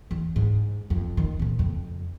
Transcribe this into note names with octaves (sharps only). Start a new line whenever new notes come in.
E2
G#2
F2
D#3
A#2 C#3
F2